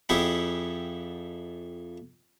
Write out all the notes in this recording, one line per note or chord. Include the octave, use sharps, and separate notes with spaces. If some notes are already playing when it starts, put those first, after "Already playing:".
F2 E4 G4 G#4 F#5 B5